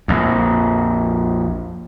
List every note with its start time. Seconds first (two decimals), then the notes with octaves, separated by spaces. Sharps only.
0.08 A#1 F2